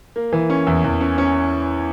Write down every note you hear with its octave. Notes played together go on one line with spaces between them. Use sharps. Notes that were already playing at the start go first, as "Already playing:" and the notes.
A#3
E3
C#4
E2
E2
C#4
C#4